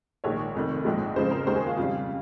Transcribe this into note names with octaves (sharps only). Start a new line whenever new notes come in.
A#1 G#2 D#3 G#3 C#5
F1 F2 D#3
A#1 G#2 F3 G#3
F2 C#3 F3 G#3 C5
A#4
D#2 D#3 G#3 C5
G#4
F4
F2 C#3 G3 F4